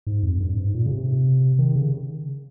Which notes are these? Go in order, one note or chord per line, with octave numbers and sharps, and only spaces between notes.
G#2
F2
G2
G#2
A#2
C#3
C3
D#3
C#3